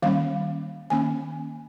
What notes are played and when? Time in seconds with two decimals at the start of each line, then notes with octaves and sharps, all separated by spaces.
0.02 D#3 G3 A#3 C#4 F5
0.90 D#3 A#3 C#4 G#5